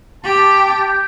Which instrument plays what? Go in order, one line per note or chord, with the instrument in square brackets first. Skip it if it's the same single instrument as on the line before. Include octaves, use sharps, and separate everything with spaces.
[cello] G4 [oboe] A5
[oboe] G5